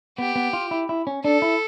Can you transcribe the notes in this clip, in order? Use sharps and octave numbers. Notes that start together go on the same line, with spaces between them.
B3 G4
B3
F4
E4
E4
C#4
D4 A4
E4